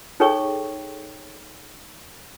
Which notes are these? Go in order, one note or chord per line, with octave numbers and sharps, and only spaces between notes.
D#4 G#4 A4 C#5 G5 C#6